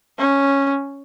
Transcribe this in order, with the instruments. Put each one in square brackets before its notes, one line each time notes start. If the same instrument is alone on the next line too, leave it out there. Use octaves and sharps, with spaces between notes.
[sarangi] C#4